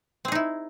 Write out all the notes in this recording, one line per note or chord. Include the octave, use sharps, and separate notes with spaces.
C4 D#4 E4 G#4